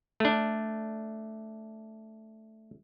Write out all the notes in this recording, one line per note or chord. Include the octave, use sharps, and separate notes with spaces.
A3 D4